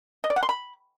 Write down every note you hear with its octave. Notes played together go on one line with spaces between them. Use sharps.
D#5
D5
F#5
C6
B5